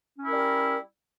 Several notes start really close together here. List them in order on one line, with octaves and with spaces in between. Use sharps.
C#4 E4 A#4 G3